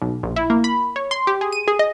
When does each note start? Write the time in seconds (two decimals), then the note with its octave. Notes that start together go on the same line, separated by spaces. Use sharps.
0.02 B1
0.23 A#1
0.36 E4
0.50 A#3
0.64 B5
0.96 C#5
1.11 C6
1.27 G4
1.41 G#4
1.53 D#7
1.68 G#4
1.79 D#5